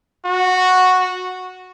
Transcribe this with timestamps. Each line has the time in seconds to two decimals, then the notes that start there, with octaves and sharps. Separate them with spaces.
0.25 F#4